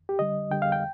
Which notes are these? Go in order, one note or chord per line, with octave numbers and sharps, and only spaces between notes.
G4
D3 G3 D#5
D3 G3 G5
F5
G5